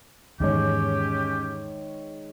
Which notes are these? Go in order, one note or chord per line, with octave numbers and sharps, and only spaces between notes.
E2 G#2 D#3 G#3 C#4 G4 C#5